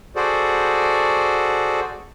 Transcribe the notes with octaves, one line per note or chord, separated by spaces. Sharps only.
F#4 G#4 A4 C5 D5